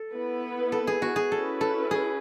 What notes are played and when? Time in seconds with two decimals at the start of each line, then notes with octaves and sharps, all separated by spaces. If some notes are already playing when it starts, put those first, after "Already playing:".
Already playing: A4
0.13 B3 E4 B4
0.72 A4
0.87 G#4
1.02 F#4
1.16 G#4
1.31 C#4 E4 A4 B4
1.61 A4
1.91 G#4